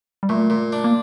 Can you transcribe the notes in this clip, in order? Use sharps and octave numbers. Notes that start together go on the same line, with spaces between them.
G3
A#2 A3
A#2
D4
A#3